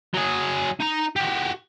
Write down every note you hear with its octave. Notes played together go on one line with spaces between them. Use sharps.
F#3 G#4
D#4 A#5
F#4 G4